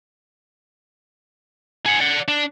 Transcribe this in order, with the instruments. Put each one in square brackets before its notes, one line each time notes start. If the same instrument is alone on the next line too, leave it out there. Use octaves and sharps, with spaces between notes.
[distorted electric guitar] G#4 F#5
D5 F#5
D4